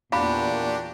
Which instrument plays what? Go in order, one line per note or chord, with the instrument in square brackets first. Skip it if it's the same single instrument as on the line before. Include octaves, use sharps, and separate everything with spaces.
[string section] E2 A#3 [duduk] A#2 [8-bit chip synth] D4 F#4 G4 [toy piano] F5 B5